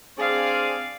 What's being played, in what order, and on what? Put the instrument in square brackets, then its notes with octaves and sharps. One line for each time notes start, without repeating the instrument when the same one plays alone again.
[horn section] C4 D4 G#4 [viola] D5 F5